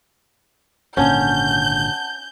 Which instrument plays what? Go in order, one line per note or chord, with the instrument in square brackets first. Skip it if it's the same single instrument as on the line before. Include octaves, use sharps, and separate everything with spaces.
[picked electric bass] G#1 A#2 D3 [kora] C#4 [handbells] F#5 A5 [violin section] G6